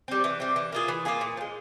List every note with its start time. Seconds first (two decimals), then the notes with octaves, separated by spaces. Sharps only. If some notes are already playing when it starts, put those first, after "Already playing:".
0.08 G3 C4
0.24 E3
0.40 G3 C4
0.56 E3
0.72 A#3 F4 G#4
0.88 E3
1.05 A#3 F4 G#4
1.21 A#2
1.37 F3
1.41 G#3